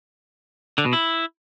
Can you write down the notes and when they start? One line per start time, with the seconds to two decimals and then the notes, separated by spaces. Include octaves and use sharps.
0.78 D3
0.85 B2
0.93 E4